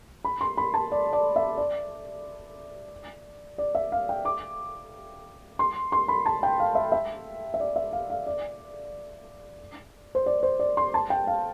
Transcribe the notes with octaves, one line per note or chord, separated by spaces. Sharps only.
B5
C6
B5
A5
D5
D5
E5
D5
D5
E5
F5
G5
D6
C6
C6
B5
A5
G5
F5
E5
E5
E5
D5
E5
F5
F5
D5
C5
D5
C5
D5
C6
A5
G5
F5